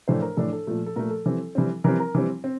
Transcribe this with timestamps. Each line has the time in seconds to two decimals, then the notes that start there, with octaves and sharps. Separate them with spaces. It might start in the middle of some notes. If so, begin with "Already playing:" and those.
0.08 A2 E3 A3 D4 C5
0.22 A#4
0.37 A2 E3 A3 D4 A4
0.53 A4
0.67 A#2 F3 A3
0.86 A4
0.96 A#2 F3 A3 A#4
1.11 A4
1.26 E3 G3 C4
1.55 E3 G3 C4
1.84 E3 G3 C4 A#4
2.00 A#4
2.15 E3 G3 C4
2.44 C4